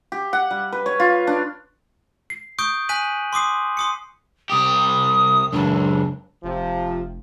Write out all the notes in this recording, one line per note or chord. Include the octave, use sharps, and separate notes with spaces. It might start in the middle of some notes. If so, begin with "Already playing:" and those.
G4
F#5
G3
B4
C#5
F4
D4
C7
C#6 D#6 G6 D7
G#5 F#6 B6 D#7 F#7
C6 D6 D#6 C7
C6 D#6 C#7
C2 G4 D#6
C#2 F#2 D4
F1 C3 F3